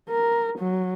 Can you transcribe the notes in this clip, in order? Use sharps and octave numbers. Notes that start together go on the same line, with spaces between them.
A#4
F#3